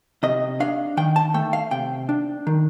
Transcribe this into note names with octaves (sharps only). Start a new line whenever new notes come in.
C3 D#5
D4 F5
D#3 G5
A5
A3 G5
F5
C3 G5
D4
D#3